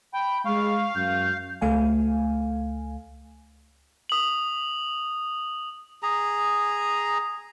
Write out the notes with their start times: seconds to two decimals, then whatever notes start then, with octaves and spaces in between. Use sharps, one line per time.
0.14 G5 B5
0.45 G#3 F5 C#6
0.95 F#2 G6
1.61 C#2 A3 F5 G#5
4.09 D#6 F#7
6.03 G#4 A#5